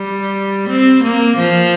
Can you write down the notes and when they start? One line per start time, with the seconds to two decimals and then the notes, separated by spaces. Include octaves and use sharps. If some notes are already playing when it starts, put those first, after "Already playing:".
Already playing: G3
0.69 C4
1.04 A#3
1.37 F3